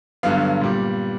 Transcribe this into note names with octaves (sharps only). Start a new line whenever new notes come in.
G2 D3 F#3 B3 F5
A#2 G3 B3